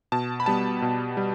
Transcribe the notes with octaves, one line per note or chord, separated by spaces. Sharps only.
B2 A5
B5
G3 B3 A5
B2
G3